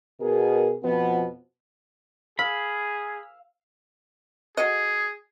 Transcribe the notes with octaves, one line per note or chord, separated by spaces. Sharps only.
B2 G#4 A#4
F2 B2 F3 B3
G#4 F5 B5 E6
F#4 G#4 A4 D#5